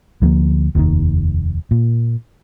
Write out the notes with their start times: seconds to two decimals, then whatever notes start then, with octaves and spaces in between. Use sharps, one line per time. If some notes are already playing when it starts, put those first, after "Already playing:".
0.22 D2 F3 G#3 A#3
0.75 F1 D#2 G#2 D#3
1.71 A#2